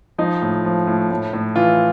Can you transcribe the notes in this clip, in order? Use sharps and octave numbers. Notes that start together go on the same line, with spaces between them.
F3 D#4
A2
F3
A2
A2
A2
E3 F4